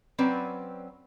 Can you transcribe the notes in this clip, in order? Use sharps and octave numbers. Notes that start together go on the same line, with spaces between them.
F#3 C4 C#4 B4 D5